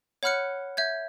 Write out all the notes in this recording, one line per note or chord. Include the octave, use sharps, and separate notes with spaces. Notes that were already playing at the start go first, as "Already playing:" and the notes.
C#5 F#5 B5 F6 F#6 C#7
E5 G6 G#6